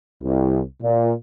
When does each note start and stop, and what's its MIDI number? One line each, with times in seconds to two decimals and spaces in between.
0.23 0.61 36
0.82 1.13 46